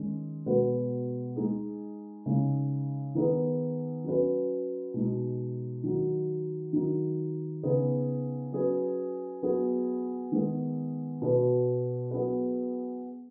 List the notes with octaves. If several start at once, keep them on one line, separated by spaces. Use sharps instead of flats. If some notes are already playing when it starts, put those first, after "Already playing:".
Already playing: D#3 G#3 C#4
B2 G#3 B3 F#4 B4
G#3 D#4 G#4
C#3 G#3 D#4
D#3 B3 D#4 G#4 B4
F#3 C#4 F#4 B4
B2 G#3 D#4
D#3 F#3 D#4
D#3 F#3 D#4
C#3 B3 D#4 G#4 B4
F#3 C#4 G#4 B4
F#3 B3 G#4
D#3 G#3 B3 G#4
B2 B3 F#4 B4
F#3 B3 G#4 B4